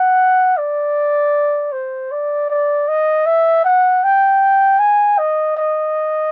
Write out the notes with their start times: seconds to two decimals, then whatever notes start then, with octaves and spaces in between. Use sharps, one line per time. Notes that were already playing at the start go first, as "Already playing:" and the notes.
Already playing: F#5
0.57 D5
1.72 C5
2.11 D5
2.50 D5
2.88 D#5
3.26 E5
3.64 F#5
4.04 G5
4.79 G#5
5.18 D#5
5.57 D#5